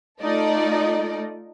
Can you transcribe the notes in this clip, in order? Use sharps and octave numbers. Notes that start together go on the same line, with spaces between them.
A3 D#4 F4 A4 D5 D#5